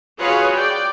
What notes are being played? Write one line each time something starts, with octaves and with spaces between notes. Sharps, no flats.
F4 F#4 G#4 B4 C#5 F5
D5 G5